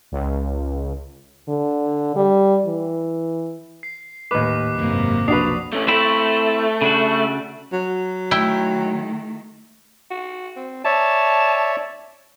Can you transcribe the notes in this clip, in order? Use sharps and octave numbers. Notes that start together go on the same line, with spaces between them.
C#2
D3
G3
E3
C7
D#2 A2 B4 D6
G#1 F#2 C3 A#3
B1 F2 D4 F#4 B4 D#6 C7 F7
A3 C#4
A3 C4 E4
C#3 D4 F#4
F#3
D#3 A3 E4 G5
F#4
C4
C#5 D5 E5 A5